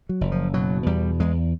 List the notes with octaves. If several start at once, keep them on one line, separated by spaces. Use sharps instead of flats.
F#3
F#1
F3
B2 F#3
E2 G3
E2 G#3